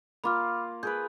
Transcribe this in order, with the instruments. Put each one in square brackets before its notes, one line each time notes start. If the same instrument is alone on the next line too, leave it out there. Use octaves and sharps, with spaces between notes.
[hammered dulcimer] A#3 F4 [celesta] B5 D6 F6
[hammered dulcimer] G#4 A#4 B4 [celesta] G6